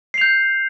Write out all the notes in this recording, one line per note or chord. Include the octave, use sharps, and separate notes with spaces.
G6 C7 F7